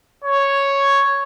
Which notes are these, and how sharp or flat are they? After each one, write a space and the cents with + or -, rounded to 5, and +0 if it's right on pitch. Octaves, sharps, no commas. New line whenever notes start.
C#5 +0